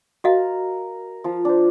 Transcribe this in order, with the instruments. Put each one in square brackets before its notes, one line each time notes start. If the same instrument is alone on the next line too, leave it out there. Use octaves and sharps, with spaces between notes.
[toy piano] F#4 D#5 F5 [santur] A#4
[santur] F3 F4
D4 C5